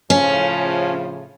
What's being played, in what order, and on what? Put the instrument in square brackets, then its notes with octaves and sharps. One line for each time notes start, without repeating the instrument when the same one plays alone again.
[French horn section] A2 C#3 F3 [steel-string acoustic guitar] C#4